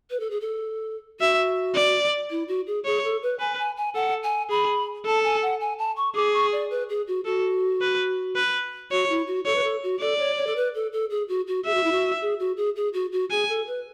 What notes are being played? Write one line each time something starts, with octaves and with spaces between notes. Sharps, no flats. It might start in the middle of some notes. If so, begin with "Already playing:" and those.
B4
A4
G#4
A4
F#4 E5
D5
E4
F#4
G#4
G#4 C#5
A4
B4
B4 G#5
G#5
G#5
A4 F#5
G#5
G#4 B5
A4 A5
G#5
F#5
G#5
A5
C#6
G#4 D6
C#6
D5
B4
G#4
F#4
F#4 A4
B4
B4
F#4 C#5
E4
F#4
A4 C#5
B4
A4
F#4
A4 D5
C#5
C#5
A4
B4
A4
A4
G#4
F#4
F#4
G#4 E5
F#4
E4
F#4
G#4
F#4
G#4
G#4
F#4
F#4
G#4 G#5
A4
B4